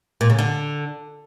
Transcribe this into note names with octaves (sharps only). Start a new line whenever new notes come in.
A#2
C#3
D3